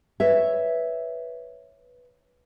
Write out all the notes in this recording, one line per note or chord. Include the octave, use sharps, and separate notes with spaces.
B4 C#5 E5